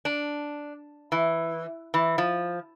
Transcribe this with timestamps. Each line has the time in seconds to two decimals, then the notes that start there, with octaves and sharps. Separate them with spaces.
0.05 D4
1.12 E3
1.94 E3
2.18 F3